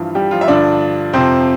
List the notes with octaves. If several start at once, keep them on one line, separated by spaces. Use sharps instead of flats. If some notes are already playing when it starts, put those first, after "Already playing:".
Already playing: G2 E3 F3 F4
G3 G4
F3 F4
E5
G2 D3 F3 D4 D5
F2 C3 F3 C4 C5